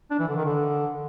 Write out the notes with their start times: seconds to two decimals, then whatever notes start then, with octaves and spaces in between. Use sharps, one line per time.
0.11 D4
0.19 E3
0.28 D3
0.37 D#3
0.45 D3